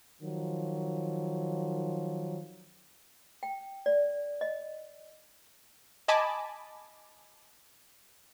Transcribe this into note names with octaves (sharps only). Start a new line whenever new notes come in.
D#3 F3 F#3
G5
D5
D#5
D#5 G#5 A5 B5 D6